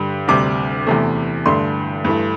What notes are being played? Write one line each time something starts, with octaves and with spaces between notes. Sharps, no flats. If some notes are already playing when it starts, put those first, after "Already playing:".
Already playing: G2 D3 G3
D2 C3 G3 D6
E2 C3 A3
G2 D3 A3 C6
G2 E3 A3